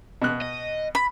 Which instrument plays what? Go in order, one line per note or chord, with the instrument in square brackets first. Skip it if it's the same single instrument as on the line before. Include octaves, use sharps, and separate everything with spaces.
[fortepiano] B2 F#6
[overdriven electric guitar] D#5
[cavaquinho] B5